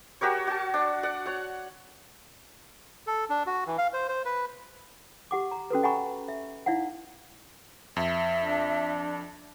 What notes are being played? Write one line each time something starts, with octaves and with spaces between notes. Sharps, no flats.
F#4 G4 A#4 C#5
F#4 A5
D4
D5 F#5
C#5 F#5
A4
D4
F#4
E3
F5
C5
C5
B4
G4 F#5 D6
A#5
C#4 F#4 A4 B4
D#5 F#5 G#5 A#5 B5 C#6
E5
D#4 E4 D5 F5 F#5
F2 E5
D4